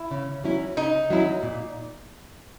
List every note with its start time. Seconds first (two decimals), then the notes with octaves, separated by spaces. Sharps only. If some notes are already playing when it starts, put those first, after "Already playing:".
Already playing: E4
0.11 C#3
0.44 F#3 C#4 E4
0.77 C#3 D#4
1.10 F#3 C#4 E4
1.43 A#2